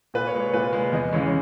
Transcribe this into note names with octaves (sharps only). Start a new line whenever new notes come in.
A#2 B4
C#5
G#3
C#5
A#2 B4
G#3
E2 D#5
C#3 E3 G#3 C#5